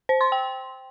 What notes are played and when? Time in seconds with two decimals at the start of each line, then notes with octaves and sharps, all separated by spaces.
0.09 C5
0.21 C6
0.32 G5